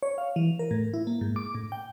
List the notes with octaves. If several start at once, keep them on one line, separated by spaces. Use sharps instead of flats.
C#5
F5
E3
A#4
A2
E4
A#3
G#2
D6
A2
G5